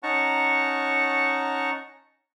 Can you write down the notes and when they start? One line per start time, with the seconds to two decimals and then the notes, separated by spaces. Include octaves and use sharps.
0.03 C#4 D#4 F#5 A5 A#5 C#6